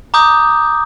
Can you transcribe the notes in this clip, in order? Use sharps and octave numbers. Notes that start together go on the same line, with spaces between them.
A#5 D6 D#6 G6